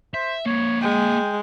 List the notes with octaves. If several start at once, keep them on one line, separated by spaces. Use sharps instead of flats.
C5 E5
A#3 C4 C#5
G#3 G5